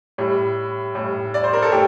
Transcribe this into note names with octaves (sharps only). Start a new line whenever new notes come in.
A2 G3
A2 G3
D5
C5
A#4
A4
A2 G4